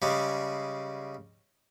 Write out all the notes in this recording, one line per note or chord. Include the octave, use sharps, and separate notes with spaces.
C#3 G3 G#3